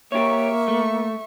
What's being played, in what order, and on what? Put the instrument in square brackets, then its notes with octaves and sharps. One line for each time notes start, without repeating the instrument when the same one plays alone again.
[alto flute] A#3 [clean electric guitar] G4 C#5 [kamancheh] E5 C#6
[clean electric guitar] A3